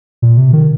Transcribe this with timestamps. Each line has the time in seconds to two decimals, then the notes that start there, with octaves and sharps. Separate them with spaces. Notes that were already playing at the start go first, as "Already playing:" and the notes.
0.22 A#2
0.37 C3
0.53 D#3